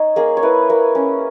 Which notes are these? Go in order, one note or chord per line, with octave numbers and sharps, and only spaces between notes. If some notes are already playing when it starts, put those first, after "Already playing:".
Already playing: D#4 C#5
A#3 G#4
C#5
E4 B4
A#3
C#4